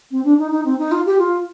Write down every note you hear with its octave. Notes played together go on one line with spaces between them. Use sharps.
C4
D4
D#4
D#4
C4
D#4
F4
G4
F4